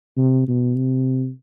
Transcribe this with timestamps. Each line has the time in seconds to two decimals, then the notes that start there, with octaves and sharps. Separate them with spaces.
0.17 C3
0.48 B2
0.77 C3